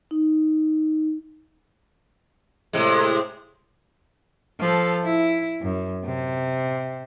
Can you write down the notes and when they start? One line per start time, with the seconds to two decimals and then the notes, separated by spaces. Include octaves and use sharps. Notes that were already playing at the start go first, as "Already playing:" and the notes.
0.11 D#4
2.73 A2 C3 G#3
4.60 F3 A4
5.04 E4
5.62 F#2
6.05 C3